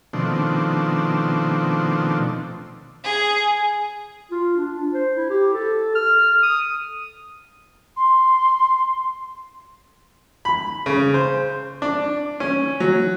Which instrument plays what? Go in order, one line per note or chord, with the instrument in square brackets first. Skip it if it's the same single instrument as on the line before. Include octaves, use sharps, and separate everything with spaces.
[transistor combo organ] B2 D#3 F3 A3 C4 D4
[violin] G#4
[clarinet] F4
D4
C5
E4
G4
A4
F6
D#6
[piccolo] C6
[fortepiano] B5
C#3
C5
D4
C#4
F#3